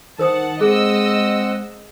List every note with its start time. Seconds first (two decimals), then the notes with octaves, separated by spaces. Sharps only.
0.19 D#3 A#4 C5 F#5 A5 D#6
0.61 G#3 C4 G#4 D#5 F#5 E6